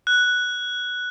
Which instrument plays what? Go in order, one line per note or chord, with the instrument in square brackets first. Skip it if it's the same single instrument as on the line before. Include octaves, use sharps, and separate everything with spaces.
[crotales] F#6